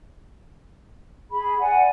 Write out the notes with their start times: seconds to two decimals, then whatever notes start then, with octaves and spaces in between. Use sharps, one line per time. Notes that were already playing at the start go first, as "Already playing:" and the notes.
1.31 G#4 B5
1.59 D5 F#5 G#5